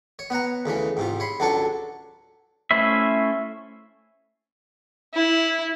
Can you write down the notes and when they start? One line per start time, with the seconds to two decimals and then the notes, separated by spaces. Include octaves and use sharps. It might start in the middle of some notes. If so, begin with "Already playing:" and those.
0.19 C#5
0.30 B3 C#5 F#5 A#5
0.66 D2 C#3 E3 C#4
0.97 G#2 C3 F4
1.20 C#5 B5 C6
1.40 C#2 F#3 D4 A4 C#5 C#6
2.71 A3 C#4 E4 C5 E5
5.14 E4